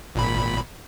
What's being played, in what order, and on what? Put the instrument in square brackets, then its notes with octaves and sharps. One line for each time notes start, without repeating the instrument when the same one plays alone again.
[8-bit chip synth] G#1 A#2 B5